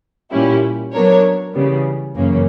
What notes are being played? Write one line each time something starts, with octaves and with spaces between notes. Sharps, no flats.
A#2 G3 C#4 E4 G4
F#3 B3 D4 A#4 C#5
C#3 E3 G3 B3
F#2 C#3 E3 A#3 C#4